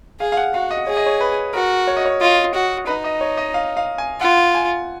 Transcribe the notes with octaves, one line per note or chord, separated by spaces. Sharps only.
G#4 F5
F5
F#5
F#4 F5
D#5
G#4 C#5
D#5
C#5
B4
F#4 A#4
C#5
D#5
C#5
F4 D#5
F#4
D#4 B4
D#5
C#5
D#5
F5
F5
G#5
F4 F#5
G#5